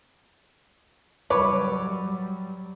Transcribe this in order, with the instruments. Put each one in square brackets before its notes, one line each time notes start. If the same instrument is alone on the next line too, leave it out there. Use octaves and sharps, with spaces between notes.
[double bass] F#3 G3 [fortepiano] B4 C#5 D6